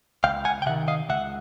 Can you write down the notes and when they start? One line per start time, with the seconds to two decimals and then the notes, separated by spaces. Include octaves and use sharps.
0.24 C#2 F5 G5
0.45 F#5 G#5
0.62 G5
0.66 C3 D#3 E5 F#5
0.88 D#5 F5
1.09 C#2 E5 F#5